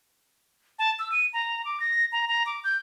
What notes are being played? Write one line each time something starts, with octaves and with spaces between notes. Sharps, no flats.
A5
E6
D#7
A#5
D6
A#6
A#5
A#5
D6
G6